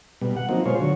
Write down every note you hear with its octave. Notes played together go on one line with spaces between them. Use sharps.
B2 G3
F#5
F3 F#3 A#3 C4 D#4
B2 G#3 F4 C5 C#5
D3 F#3 C#5